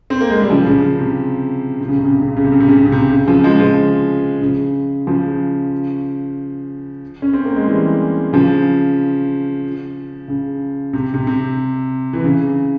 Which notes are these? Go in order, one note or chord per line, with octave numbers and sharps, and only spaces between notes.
C4
A#3
G#3
G3
C#3 F3
C#3
C#3
C3
C3
C#3
C3
C#3
C3
C#3
C3
C#3
C3
C#3
C3
C#3
C3
C#3
C3
C#3
C#3 F3
F3 G#3
C#3 F3
C#3
C#3 F3
C#4
C4
A#3
G#3
E3 G3
C#3 F3
C#3
C3
C3
C3
E3
C#3